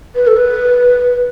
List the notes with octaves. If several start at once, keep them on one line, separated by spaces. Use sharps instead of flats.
B4
A4
B4